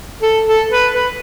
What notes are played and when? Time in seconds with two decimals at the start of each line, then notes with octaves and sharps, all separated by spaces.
0.23 A4
0.47 A4
0.71 B4
0.94 B4